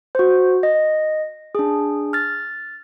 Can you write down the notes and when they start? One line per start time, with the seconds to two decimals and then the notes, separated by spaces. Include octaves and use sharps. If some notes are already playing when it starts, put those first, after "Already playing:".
0.15 F#4 C5
0.63 D#5
1.55 D4 G#4
2.13 F6 A6